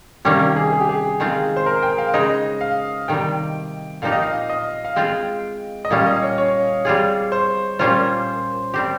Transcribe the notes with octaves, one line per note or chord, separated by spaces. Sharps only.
C3 D#3 G3 A#3 C#4 G4
G4
G#4
G#4
G4
G#4
D#3 G#3 C4 F4
C5
A#4
G5
F5
C#3 G#3 D#4 D#5
F5
C3 D#3 G3 G5
A#2 F3 C4 D#4 G4 F5
D#5
F5
D#5
F5
G#3 C4 F4 G5
D#5
A#2 G3 C#4 F5
D#5
C#5
C#5
G3 C4 F4 G#4
C5
A#2 G3 A#3 C#4 F4 C5
G3 C4 G4